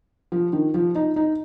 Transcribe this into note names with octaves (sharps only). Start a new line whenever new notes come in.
F3
D#3
F3
D#4
D#4